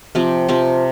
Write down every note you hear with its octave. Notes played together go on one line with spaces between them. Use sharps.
C3 F3 C4 G4
C3 F3 C4 G4